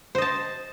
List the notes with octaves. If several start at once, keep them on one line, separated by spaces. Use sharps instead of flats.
C5 D#5 A5